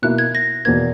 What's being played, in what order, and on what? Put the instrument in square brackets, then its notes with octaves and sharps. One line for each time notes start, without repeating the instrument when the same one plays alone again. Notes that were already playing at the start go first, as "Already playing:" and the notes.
[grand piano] B2 A#3 E4 [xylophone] F#6
[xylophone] G#6
A#6
[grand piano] E2 B2 A#3 [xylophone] G#6